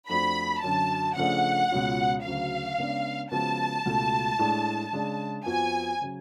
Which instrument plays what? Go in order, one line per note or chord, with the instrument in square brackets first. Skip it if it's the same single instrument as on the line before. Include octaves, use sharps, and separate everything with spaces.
[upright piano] F2 F3 A3 D4 F#4 [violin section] B5
[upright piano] F#2 D3 F#3 [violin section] A5
[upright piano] C#3 F3 A3 D4 G#4 [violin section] F#5
[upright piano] C#2 B2 G#3 C#4 F4
[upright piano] D2 C#3 F#3 [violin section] F5
[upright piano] C#3 G#3 B3 D4
[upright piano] C#3 F3 G#3 B3 F#4 [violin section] A5
[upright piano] C#2 B2 A3
A2 G#3 D4
C#3 G#3 D4
[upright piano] F2 F3 B3 F#4 [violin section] G#5
[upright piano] C#3 F#3